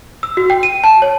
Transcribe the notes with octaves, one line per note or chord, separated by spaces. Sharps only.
E6
F#4
G5
D#7
A5
C#5